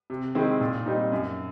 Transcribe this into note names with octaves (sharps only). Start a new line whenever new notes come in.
C3
D#3 G#3 C4 E4
A#2
G3 C4 D#4
F#2